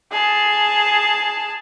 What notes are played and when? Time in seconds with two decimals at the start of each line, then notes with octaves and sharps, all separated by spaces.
0.11 G#4 A5